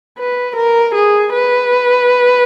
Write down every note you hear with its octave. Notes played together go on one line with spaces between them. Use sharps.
B4
A#4
G#4
B4